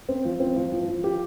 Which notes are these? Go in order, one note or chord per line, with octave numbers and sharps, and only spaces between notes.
C4
F3
C4
F3
F3
F3
G4